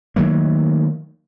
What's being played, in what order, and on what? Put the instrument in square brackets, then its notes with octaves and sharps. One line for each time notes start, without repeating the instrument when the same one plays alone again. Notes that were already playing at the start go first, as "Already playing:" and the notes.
[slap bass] D#3 F#3 A3 A#3